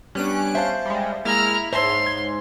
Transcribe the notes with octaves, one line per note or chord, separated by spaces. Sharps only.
G3 B3 C#4 D4 F#6 D7
C5 E5 F5 A5 G6
G3 G#3
G#3 A#3 E4 A#5 F6
G#2 C5 C#5 E5 A5 C6 E6
G#6